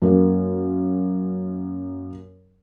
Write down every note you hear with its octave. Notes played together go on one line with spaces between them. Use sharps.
F#2 A#3